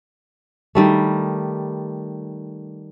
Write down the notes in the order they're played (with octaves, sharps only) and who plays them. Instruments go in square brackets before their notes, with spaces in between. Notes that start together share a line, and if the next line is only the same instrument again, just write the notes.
[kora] D#3 G3 A3